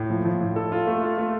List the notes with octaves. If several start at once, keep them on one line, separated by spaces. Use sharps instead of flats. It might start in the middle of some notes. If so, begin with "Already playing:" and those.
Already playing: A2
F3
F3
A2
A4
F4
A3
F4
A3